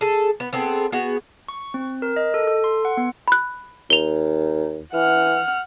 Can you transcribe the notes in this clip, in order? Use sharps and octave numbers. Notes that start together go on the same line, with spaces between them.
G#4 A4
B3
B3 C4 G#4 A4
B3 F#4 G#4
C#6
C4
A#4
D#5
A4
A4
C6
F#5
B3
B5 F#6
D#2 F7 G7
E3 F#5 F6